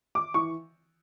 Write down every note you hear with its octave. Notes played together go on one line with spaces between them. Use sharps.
D6
E3 C#6